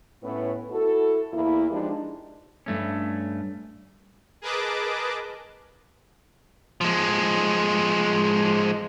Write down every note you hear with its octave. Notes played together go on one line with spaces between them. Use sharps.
A2 B3 C#4 E4 B4
E4 F#4 A4
E2 A#3 E4
F3 G#3 D4 D#4 G4
G2 A3 C#4
G#4 A#4 B4 D#5 A5 D6
F3 G#3